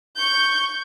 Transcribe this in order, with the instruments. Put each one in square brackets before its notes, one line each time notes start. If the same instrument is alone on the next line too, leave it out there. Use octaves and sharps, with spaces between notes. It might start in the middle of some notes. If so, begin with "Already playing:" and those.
[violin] C#6 G6